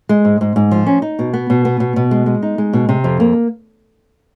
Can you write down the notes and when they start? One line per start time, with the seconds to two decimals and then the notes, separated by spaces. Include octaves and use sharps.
0.09 G#3
0.25 G#2
0.41 G#2
0.56 G#2
0.71 F3
0.86 C#4
1.02 D#4
1.19 B2
1.33 B3
1.50 B2
1.65 B3
1.80 B2
1.96 B2
2.11 G#3
2.26 G#3
2.42 D#4
2.58 G#3
2.73 B2
2.89 C3
3.04 F2
3.20 A#3